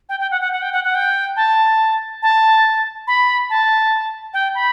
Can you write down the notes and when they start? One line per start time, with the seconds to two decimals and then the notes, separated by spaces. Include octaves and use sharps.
0.09 G5
0.20 G5
0.31 F#5
0.41 F#5
0.52 F#5
0.62 G5
0.73 F#5
0.84 F#5
0.95 G5
1.36 A5
2.22 A5
3.07 B5
3.50 A5
4.34 G5
4.55 B5